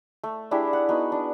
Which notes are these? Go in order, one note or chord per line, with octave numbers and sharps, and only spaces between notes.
A3
D4 E4 G4 G#4
F#5
B3 D#4 F#4
D4